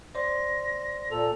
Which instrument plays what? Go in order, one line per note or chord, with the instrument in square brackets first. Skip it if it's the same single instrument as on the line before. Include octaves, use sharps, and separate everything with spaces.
[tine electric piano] C5 D5 C6 [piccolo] A#6
[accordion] A#2 A4 [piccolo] F7